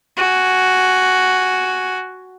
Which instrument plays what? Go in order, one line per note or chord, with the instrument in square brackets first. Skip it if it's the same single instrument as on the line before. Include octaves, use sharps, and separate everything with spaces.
[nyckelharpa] F#4 G#5